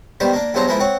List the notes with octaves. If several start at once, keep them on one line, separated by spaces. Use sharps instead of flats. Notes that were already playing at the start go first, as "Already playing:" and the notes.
D#3 G3 B3 C5
A#3 D4
E2 G2 F#3 C5 A5 A#5
F3 G#3 A#3 B3 E4
C4 C#5 F#5